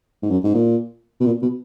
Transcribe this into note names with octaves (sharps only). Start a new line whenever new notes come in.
G#2
F#2
G#2
A#2
B2
A#2
B2